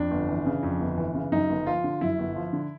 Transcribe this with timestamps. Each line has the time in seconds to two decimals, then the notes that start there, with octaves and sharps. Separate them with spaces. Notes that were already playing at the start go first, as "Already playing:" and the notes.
Already playing: F2 D4
0.11 G1
0.29 E3
0.46 C#3
0.63 F2
0.80 G1
0.98 E3
1.14 C#3
1.32 F#2 D#4
1.49 G1
1.66 F3 F4
1.84 D3
2.01 F#2 E4
2.18 G1
2.36 F3
2.53 D3